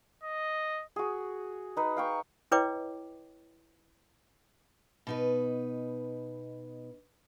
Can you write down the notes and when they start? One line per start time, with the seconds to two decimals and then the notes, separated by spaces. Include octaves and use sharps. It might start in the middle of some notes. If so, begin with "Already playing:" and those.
0.23 D#5
0.96 F#4 G#4
1.77 D#4 B4
1.97 F5 G5 C#6
2.52 E4 B4 C#5 D#5 G5 D6
5.07 B2 D#4 B4